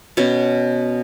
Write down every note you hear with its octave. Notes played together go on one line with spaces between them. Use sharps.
B2 B3 C#4